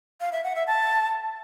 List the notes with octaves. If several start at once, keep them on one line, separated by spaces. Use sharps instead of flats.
F5
E5
F#5
E5
A5